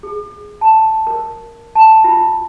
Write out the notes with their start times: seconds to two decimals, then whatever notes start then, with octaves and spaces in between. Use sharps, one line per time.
0.03 G#4
0.61 A5
1.07 A#4
1.75 A5
2.04 F4